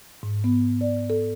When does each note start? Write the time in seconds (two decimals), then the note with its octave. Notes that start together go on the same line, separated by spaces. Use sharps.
0.23 G#2
0.44 B3
0.81 D5
1.10 A4